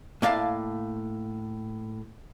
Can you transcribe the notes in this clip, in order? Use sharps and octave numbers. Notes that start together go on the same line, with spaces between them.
A2 A#3 D5 F5 A5